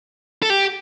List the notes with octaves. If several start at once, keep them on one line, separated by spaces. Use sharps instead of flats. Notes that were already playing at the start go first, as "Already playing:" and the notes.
A4
G4